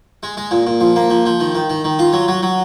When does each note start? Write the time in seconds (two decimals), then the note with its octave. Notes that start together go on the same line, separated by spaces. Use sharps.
0.23 G#3
0.37 G#3
0.51 A#2
0.67 A#2
0.81 F3
0.96 A#3
1.10 F3
1.26 F3
1.40 D#3
1.55 D#3
1.70 D#3
1.84 D#3
1.99 F4
2.13 F#3
2.28 F#3
2.43 F#3